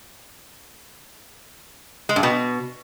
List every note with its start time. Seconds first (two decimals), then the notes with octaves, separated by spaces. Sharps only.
2.09 G#3
2.16 G2
2.23 B2